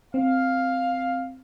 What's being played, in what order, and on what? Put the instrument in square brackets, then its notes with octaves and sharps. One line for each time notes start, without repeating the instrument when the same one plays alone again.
[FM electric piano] C4 [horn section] F5